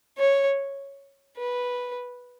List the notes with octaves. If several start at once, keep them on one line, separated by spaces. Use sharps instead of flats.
C#5
B4